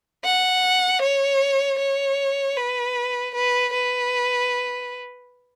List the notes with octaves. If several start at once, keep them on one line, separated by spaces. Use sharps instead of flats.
F#5
C#5
C#5
B4
B4
B4